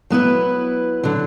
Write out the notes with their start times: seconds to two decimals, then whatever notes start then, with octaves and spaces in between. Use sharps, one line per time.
0.10 F#3 B3 E4 B4
1.03 D3 F#3